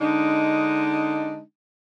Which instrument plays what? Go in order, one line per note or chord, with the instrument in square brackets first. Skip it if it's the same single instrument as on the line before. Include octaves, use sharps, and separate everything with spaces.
[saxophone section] D3 G#3 D4 D#4